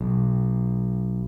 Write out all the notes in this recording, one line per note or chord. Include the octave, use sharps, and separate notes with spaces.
B1